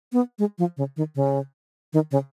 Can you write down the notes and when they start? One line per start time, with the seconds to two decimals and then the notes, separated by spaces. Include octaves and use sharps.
0.13 B3
0.39 G#3
0.58 F3
0.77 C#3
0.97 D#3
1.15 C#3
1.93 D#3
2.11 C#3